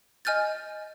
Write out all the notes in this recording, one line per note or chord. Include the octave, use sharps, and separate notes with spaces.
D#5 G#5 F6 G6 A6